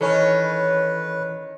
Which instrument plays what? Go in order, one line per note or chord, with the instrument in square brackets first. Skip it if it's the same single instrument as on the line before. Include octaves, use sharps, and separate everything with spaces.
[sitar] D#3 C#4 [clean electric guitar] E3 [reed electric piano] A4 C#5 [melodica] B4